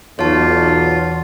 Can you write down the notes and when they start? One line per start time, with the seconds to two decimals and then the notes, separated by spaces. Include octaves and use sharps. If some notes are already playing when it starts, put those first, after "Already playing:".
0.19 B1 E2 F4 C#5 A5